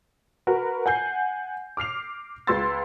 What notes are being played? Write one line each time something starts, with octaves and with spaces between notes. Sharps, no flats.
F#4 A#4 B4
F#5 G#5 G6 C7
D6 F6 C7 F7
C#2 B4 B5 C6 E6 A6